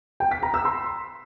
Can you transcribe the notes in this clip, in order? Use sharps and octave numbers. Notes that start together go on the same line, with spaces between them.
G5
B6
A#5
E6
C6